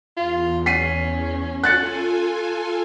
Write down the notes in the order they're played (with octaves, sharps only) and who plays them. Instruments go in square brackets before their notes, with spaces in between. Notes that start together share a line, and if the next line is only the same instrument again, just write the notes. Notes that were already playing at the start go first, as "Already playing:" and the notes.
[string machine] E2 [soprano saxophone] F4
[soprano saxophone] C#4 [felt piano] B6 C7 D#7
[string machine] F4 A4 G#5 [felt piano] F#6 A6 C#7